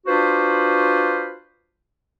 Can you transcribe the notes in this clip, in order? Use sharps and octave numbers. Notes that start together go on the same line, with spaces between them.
D4 F4 F#4 B4 C5